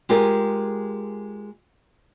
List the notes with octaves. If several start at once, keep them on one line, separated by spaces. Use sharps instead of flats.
G#3 F4 G4 G#4 A#4